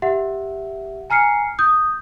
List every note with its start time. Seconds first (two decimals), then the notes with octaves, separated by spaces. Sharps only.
0.02 G4 E5 F#5
1.10 G#5 A#5 F6 C7 C#7
1.59 D#6 G6